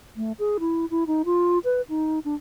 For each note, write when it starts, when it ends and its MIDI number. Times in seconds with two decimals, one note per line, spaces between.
0.17 0.32 57
0.39 0.57 68
0.60 0.86 64
0.91 1.04 64
1.07 1.22 63
1.25 1.59 65
1.64 1.81 71
1.89 2.19 63
2.25 2.35 62